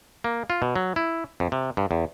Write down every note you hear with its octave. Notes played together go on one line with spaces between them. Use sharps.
A#3
F4
B2
F#3
E4
F2
C3
G2
E2